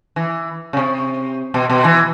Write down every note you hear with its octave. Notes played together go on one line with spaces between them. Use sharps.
E3
C#3
C3
B2
B2
E3